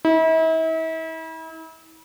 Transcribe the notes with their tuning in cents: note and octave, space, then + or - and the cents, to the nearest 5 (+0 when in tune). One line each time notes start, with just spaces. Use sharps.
E4 -40